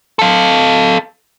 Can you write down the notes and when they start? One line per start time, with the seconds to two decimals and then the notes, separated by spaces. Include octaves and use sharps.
0.19 A4 F5